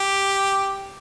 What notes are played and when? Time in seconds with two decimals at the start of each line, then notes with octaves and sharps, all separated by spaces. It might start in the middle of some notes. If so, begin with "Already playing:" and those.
Already playing: G4